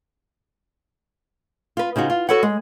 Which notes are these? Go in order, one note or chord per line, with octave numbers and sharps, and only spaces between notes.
F4 B4
C#3 D#4 F4 F#4
F4
F#4 A4 B4 C#5 F#5
G#3